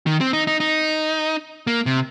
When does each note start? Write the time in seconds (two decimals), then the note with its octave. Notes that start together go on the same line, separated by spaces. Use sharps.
0.06 D#3
0.21 C4
0.33 D#4
0.47 D#4
0.60 D#4
1.67 A#3
1.86 C3